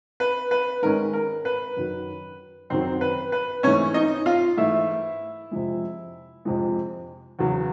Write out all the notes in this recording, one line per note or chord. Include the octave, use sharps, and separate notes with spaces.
B4
B4
G#2 D#3 G#3 C#4 A#4
A#4
B4
F#2 D#3 F#3
F#2 D#3 F#3 C4 C5
B4
B4
G#2 E3 A3 C#4 C#5
D#4 D#5
F4 F5
G#2 E3 A3 E4 E5
F2 C3 F3 G#3
F2 C3 F3 G#3
E2 C#3 F#3